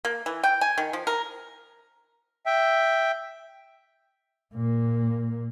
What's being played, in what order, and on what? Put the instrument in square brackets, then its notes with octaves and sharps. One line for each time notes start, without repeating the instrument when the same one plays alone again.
[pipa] A#3
E3
G5
G#5
D#3
F3
A#4
[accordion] E5 G5
[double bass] A#2 A#3